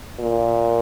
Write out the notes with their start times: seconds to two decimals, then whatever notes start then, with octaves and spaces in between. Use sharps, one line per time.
0.19 A#2